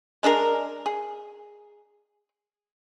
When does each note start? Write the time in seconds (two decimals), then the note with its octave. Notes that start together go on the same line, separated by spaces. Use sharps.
0.23 G#3 D4 G#4 A#4
0.86 G#4